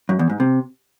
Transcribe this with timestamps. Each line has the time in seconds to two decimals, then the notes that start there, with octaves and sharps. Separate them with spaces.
0.09 F#2
0.19 E2
0.30 G#2
0.40 C3